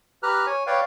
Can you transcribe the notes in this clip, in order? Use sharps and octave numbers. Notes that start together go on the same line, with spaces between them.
G4 B4 A#5 F6 F#6
C#5 G#5
B4 C#5 D5 F5 G5